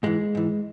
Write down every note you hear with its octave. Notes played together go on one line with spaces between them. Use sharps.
G#2 E3 G#3
G#2 E3